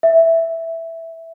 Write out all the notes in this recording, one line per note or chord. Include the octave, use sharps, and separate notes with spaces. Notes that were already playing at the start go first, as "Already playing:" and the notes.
E5